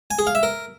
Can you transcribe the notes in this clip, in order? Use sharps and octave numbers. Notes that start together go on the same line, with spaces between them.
G#5
G#4
F5
E5
A#4